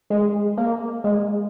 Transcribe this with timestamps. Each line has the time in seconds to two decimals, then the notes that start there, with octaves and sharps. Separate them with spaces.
0.10 G#3
0.57 A#3
1.04 G#3